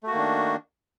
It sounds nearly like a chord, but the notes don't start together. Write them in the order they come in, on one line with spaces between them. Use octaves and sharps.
A3 F#4 A#3 D#3 D4